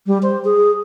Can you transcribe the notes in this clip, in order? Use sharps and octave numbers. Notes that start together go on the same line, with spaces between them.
G3
C5
G#4